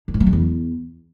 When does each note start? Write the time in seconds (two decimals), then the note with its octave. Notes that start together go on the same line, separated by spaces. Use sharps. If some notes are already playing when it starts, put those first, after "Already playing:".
0.08 D3
0.14 G#2
0.20 F#3
0.27 C#3
0.33 E2